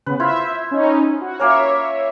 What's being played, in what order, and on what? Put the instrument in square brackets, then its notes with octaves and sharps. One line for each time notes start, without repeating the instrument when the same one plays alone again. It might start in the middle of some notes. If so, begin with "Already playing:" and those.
[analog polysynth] C#3 B3 [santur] B4
[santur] E4 F4 C5 [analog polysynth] E5
[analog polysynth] C#4 D#4
F#4
[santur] A#3 C#4 A#4 [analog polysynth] C#5 E5